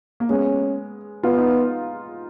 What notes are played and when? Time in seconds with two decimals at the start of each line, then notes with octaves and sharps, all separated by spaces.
0.20 A#3
0.30 G#3 B3 C#4
1.23 B3 F4
1.37 D#4